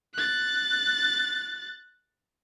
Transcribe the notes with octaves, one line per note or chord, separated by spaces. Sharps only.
F#6 A6